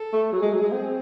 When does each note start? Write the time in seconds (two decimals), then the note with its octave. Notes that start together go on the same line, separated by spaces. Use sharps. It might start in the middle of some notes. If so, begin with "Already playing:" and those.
Already playing: A4
0.13 A3
0.32 F#3 G#4
0.42 G#3
0.53 F#3
0.62 G#3
0.73 C4